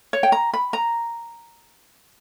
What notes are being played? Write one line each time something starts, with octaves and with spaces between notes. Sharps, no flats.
C#5
G5
A#5
B5
A#5